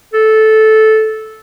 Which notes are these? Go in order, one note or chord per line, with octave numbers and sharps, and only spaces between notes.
A4